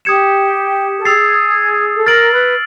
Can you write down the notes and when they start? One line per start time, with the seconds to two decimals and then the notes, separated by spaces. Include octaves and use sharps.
0.05 G4 D#6 G#6 C#7 E7
0.99 A4
1.05 G#4 E6 A6 C7 F7
1.95 A4
2.06 A#4 F6 A6 D7 F#7
2.32 B4